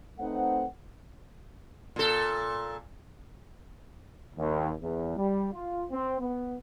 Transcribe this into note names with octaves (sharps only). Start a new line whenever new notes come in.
A3 C4 D#4 B4 C5 F#5
A#2 A4
D#2
E2
G3
F4
C4
B3